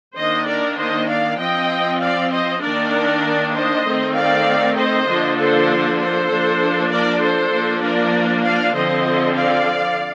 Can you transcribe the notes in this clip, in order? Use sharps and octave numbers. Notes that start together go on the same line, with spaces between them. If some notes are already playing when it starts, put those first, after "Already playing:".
D#3 A#3 D4 C5 D#5
A#4 D5
C5 D#5
D5 F5
F3 C4 D#5 G5
D5 F5
C5 D#5
D#3 A#3 D4 A#4 D5
C5 D#5
D#3 A3 C4
D5 F5
C5 D#5
D3 F3 A#3 D4
A4 C5
A4 C5
F3 A#3 D4
A#4 D5
A4 C5
F3 A#3 D4
A#4 D5
D5 F5
D3 F3 C4 C5 D#5
D5 F5